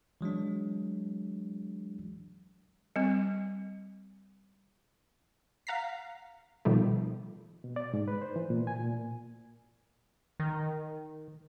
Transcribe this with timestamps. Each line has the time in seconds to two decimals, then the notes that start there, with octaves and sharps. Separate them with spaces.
0.21 E3 F#3 G#3 D4
2.96 G3 C4
5.67 F5 F#5 A#5 B6 C7
6.65 B2 D#3 F3 G3 A3
7.64 B2
7.76 D5
7.94 G#2
8.08 B4
8.22 C5
8.36 E3
8.50 A#2
8.67 G#5
8.79 A#2
10.40 D#3